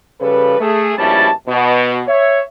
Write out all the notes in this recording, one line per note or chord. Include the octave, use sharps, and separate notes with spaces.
C#3 F3 G3 A4 B4
A3 G#4
A#1 B2 G3 C#4 E4 A5
B2
C#5 E5